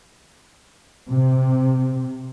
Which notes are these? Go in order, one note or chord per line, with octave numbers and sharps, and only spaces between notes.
C3